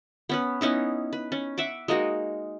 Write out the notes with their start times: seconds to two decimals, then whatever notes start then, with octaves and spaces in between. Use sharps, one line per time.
0.29 B3 C#4 B4
0.61 B3 C#4 D#4 E4
1.13 B4
1.32 C#4
1.58 E5 F#5 D6
1.88 G#3 A#3 D#4 F#4